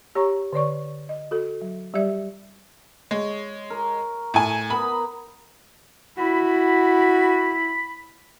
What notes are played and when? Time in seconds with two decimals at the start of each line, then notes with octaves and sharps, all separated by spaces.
0.15 G4 C#5 A#5 C#6
0.53 D3 C#5 D5 C#6
1.09 D#5
1.31 F#4 A4
1.62 F#3
1.94 G3 G4 D5 E5
3.11 G#3 C#5
3.70 A#4
4.34 A2 G#5
4.70 B3 A#4 A#5 B5
6.17 E4 F#4 B5